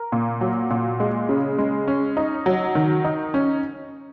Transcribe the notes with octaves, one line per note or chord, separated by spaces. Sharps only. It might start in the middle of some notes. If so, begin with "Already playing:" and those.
Already playing: A#4
A#2
F#3
A#2
G#3
C#3
G#3
C#4
D#4
F#3
D#3
D#4
C#4